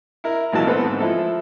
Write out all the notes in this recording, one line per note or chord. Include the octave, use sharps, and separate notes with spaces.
E4 A#4
G#1 A#2 E3 F#3 A#4 A5
B3 C4 A4 B4
G#2 D3
F3 E4 A4